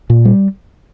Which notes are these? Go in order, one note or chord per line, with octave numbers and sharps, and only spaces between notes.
A#2
G3